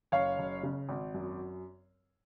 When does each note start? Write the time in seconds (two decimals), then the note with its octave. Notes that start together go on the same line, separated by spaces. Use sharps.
0.12 F#1 C#5 F5
0.39 F#1
0.63 C#3
0.89 G#1
1.14 F#2